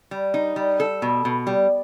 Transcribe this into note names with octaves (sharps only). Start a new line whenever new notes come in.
G3
D#4
G3
A4
B2
B2
G3